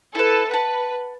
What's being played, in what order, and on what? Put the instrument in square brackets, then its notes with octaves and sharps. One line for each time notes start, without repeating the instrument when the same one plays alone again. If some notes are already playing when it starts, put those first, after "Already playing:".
[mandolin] E4 B4 [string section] A4
[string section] B4 [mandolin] F#5 A5